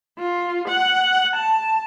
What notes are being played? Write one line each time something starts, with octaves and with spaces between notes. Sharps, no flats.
F4
F#5
A5